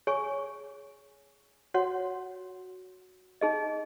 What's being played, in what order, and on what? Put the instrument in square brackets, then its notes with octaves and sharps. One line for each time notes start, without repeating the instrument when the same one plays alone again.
[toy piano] G#4 C#5 G#5 C#6
F#4 C#5 F#5 C6
D#4 G#4 D#5